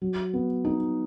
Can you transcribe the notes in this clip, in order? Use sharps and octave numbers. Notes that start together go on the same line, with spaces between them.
F#3
B3
D#4